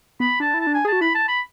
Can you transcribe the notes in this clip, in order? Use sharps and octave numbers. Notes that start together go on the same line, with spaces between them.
B3 B5
D4 A5
E4
A5
D4
G#5
G#4 A5
F#4
E4 B5
A5
B5